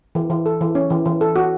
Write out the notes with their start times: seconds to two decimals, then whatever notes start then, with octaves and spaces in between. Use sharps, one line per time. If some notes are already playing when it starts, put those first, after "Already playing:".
0.15 E3
0.30 E3
0.46 A4
0.61 E3
0.75 C#4
0.90 E3
1.05 E3
1.21 A4
1.36 F#4